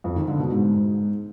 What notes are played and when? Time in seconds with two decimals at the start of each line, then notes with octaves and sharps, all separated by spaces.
0.04 F2
0.16 D#3
0.28 D3
0.39 B2
0.51 G#2